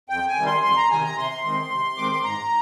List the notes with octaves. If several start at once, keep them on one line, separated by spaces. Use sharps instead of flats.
F2 G5
G#5
C3 D#3 G3
C6
F2 C6
A#5
C3 D#3 G3 G#5
A#5
C3 C6
D#3 G#3 C4
C3
D#3 G#3 C4 D6
C6
G#2 A#5